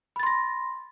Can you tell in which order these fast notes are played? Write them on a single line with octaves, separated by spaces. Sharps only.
B5 A6 C6 A#6